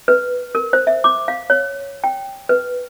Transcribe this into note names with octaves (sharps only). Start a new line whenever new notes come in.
B4
A#4
C5
E5
D6
F5
C#5
G5
B4